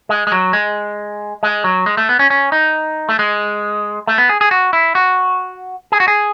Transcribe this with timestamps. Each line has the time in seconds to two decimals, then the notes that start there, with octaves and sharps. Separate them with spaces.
0.09 G#3
0.27 G#3
0.32 F#3
0.53 G#3
1.43 G#3
1.64 F#3
1.86 G#3
1.97 A3
2.09 B3
2.19 C#4
2.30 C#4
2.52 D#4
3.09 A3
3.19 G#3
4.07 A3
4.18 B3
4.29 G#4
4.41 G#4
4.51 F#4
4.73 E4
4.95 F#4
5.92 G#4
6.00 F#4
6.08 G#4